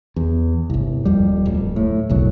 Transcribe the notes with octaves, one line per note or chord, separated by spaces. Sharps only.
E2
G1 C2
D#1 F2 G3
D1
A2
E1 B1 A2 F#3